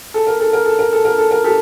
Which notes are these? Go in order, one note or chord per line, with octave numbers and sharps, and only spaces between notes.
A4
A#4
A4
A#4
A4
A#4
A4
A#4
A4
A#4
G4 A4